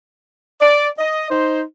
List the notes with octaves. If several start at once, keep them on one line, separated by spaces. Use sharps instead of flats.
D5
D#5
D#4 C5